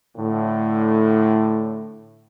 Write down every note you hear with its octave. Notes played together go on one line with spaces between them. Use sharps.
A2 D3